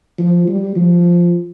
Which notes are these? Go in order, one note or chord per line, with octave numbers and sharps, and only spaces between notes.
F3
G3
F3